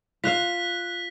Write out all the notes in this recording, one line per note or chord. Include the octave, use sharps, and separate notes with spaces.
F4 F5 F#6 B6